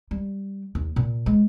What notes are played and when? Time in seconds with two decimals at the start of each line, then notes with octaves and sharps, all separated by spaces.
0.11 G3
0.75 D#2
0.96 A#2
1.26 G#3